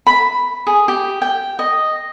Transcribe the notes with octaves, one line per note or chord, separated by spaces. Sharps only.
B5
G#4
G4
G5
D#5